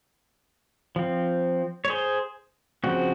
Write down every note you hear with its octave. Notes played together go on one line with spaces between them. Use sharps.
F3 C4
C#5
G#4 C5
C#3 F3 C4 F#4